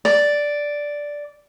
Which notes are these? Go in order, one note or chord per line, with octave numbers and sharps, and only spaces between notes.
D5